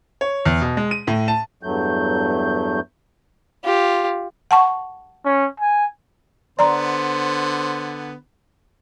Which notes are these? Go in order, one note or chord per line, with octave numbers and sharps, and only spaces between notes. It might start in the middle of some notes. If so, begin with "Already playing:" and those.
C#5
E2
B2
G#3
D#7
A2
A5
E2 G2 F#3 A3 G6
F4 G4
F#5 A5 C#6
C#4
G#5
D3 B3 C5 D5 A#5 C6